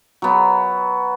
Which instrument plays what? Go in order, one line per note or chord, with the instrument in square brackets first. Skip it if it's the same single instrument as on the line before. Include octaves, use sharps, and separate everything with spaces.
[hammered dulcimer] F#3 B3